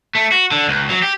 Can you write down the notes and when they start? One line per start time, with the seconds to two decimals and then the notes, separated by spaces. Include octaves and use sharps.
0.15 A3
0.32 F#4
0.51 D3
0.68 C#2
0.89 F#3
1.02 G4